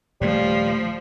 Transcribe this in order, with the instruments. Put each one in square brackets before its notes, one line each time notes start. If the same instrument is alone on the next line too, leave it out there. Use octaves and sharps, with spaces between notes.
[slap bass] D#1 A3 [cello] F3 [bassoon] G3